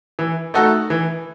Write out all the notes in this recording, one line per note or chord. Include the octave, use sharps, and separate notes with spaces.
E3
A3 D#4 F#4 A4
E3